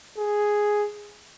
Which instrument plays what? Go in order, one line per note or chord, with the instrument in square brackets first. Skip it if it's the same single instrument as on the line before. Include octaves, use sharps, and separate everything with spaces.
[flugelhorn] G#4